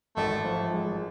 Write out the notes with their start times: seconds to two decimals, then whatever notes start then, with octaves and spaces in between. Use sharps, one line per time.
0.16 G#1 A3
0.45 F3
0.73 G#3